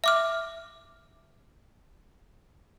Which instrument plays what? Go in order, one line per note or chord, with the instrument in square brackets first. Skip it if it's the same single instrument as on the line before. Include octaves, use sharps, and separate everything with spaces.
[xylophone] E5 D6 F6